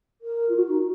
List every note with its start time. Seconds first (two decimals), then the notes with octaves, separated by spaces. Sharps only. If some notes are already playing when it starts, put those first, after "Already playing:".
0.22 A#4
0.49 F4
0.56 F#4
0.68 D#4